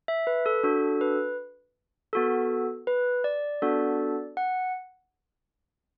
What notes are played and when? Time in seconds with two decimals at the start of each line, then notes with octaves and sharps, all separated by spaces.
0.08 E5
0.27 B4
0.46 A4
0.63 D4 F#4 A4
1.01 B4
2.13 B3 F#4 A4
2.87 B4
3.24 D5
3.62 B3 D4 F#4 A4
4.37 F#5